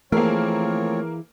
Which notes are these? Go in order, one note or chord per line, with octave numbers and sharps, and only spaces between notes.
E3 F3 A3 A#3 C4 G#4 A#4 C#5